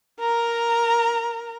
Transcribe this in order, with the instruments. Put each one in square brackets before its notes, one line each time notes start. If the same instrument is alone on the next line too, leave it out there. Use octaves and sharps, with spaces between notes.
[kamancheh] A#4 A#5